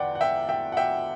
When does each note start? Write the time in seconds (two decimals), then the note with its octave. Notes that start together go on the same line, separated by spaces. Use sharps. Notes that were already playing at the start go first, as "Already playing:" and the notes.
Already playing: E2 D3 D5 F#5 G5
0.15 F#5
0.21 E5 G5
0.49 E5 G5
0.72 F#5
0.77 E5 G5